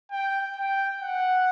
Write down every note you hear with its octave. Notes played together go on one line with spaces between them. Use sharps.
G5
G5
F#5